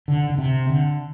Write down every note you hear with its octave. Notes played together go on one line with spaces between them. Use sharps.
D3
D3
C3
D3